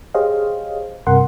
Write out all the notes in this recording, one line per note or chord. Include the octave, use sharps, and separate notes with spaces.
G4 G#4 C5 C#5 D#5 F5
G2 C3 A#4 F#5 C6